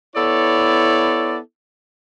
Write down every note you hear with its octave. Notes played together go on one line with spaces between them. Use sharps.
B3 E4 A4 C#5 D5